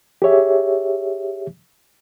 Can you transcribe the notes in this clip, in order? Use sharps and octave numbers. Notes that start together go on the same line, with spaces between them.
G4 G#4 C#5 E5